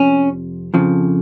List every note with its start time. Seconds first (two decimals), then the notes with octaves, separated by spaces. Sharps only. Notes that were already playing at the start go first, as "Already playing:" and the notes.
Already playing: F2 C3 F3 C#4
0.74 F2 C#3 F3